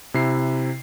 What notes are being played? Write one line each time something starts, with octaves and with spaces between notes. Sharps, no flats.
C3 E4 C7